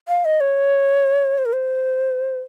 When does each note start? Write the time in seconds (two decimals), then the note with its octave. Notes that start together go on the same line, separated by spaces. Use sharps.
0.08 F5
0.25 D#5
0.40 C#5
1.38 C5
1.46 A#4
1.53 C5